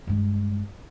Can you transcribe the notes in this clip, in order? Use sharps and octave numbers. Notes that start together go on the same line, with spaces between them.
G2 G#3